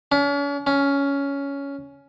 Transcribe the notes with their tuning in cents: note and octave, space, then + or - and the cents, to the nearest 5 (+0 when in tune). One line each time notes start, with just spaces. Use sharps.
C#4 +40
C#4 +10